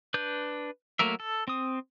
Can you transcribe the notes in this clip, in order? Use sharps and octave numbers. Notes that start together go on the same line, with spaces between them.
D4 B4 G6
F#3 A3 A#3 A#4 E5
A4
C4 D#6